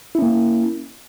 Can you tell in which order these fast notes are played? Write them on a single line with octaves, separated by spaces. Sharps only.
E4 C#4 A#3